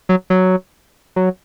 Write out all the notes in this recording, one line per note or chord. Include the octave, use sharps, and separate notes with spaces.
F#3
F#3
F#3